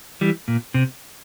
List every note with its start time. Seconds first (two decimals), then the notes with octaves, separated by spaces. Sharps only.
0.21 E3 G3
0.48 A#2
0.74 C3